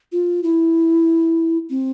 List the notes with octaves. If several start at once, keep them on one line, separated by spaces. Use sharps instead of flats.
F4
E4
C4